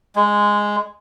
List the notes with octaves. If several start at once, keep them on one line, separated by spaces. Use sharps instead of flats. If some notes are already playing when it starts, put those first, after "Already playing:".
G#3